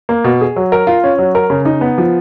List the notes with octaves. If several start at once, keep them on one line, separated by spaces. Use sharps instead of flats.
A#3
B2
G#4
F#3
A#4
F4
C#4
F#3
A#4
C#3
D#4
B3
F3